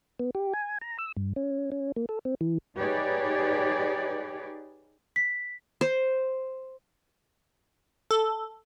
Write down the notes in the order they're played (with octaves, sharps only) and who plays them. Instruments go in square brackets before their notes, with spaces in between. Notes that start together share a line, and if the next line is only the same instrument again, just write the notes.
[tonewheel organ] B3
G4
G#5
A#5
E6
G2
C#4
C#4
A#3
A4
C4
E3
[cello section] D#4 G4 G#4 B4 C#5 D5
[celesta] B6
[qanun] C5
[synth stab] A4